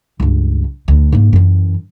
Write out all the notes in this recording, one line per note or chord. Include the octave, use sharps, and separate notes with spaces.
C#2 G2
D2
G#2 A#3
F#2 E3